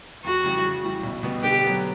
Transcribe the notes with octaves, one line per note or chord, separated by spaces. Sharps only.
F2 F#4
C#3 E3 G3
C#3
E3 G3
B1
B2 G3 B3
D3 G4
F#3 B3